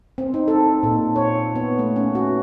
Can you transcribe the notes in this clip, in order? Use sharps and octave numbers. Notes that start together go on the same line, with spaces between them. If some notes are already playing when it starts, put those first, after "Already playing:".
C4
D#4
A4
A#2
C#5
B3
A3
C#4
F#4